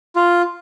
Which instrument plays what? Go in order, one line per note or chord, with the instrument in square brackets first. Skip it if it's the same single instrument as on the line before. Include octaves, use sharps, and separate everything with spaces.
[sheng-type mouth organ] F4